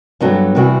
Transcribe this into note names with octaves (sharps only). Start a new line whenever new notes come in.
G2 F#3 B3 F#4 A4
C3 E3 G3 B3 F#4